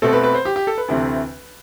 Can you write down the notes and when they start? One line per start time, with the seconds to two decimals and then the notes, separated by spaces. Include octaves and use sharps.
0.02 B2 A3 C4 A4
0.13 B4
0.23 B4
0.34 C5
0.45 G4
0.56 G4
0.67 A4
0.78 B4
0.88 D2 C3 E3 A3 C4